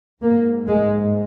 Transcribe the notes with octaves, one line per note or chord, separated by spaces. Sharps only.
G#2 A#3
G#3